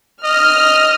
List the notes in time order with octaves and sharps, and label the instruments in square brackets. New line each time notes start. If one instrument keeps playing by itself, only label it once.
[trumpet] D#5 [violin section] F6